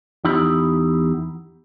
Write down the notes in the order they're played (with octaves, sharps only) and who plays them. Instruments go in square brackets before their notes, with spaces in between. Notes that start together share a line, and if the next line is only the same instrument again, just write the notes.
[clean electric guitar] E2 D#4 E4 G4 B5